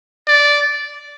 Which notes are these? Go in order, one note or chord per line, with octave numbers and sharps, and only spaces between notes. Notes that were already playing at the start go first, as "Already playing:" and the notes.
D5